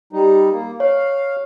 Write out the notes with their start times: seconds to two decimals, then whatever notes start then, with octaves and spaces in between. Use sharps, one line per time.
0.13 G3 D#4
0.51 A#3
0.80 C#5 F5